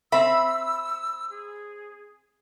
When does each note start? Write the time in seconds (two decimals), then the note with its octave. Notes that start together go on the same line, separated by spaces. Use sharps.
0.12 C4 E5 B5 E6
1.30 G#4